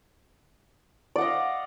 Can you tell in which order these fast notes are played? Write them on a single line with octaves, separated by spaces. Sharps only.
D5 F#5 D#5 F5